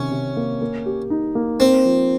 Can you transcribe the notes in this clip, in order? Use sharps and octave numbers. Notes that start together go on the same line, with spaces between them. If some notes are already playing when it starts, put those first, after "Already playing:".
Already playing: C3 D#3 C#4
C3
A#3
A#3
G4
D#4
A#3
A#3 C4
F3